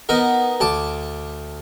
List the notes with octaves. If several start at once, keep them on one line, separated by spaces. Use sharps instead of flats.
B3 D#4 A#4
D2 A5 D6